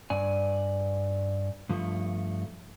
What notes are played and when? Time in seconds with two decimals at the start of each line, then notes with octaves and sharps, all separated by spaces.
0.10 G2 D5 G#5
1.69 G2 F3 A3